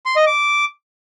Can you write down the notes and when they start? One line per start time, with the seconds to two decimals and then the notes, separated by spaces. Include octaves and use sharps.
0.06 C6
0.16 D#5
0.26 D6